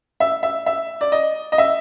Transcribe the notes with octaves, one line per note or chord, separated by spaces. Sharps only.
E5
E5
E5
D5
D#5
D#5
E5